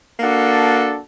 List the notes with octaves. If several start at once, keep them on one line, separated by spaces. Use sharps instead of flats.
A#3 D4 F#4 A4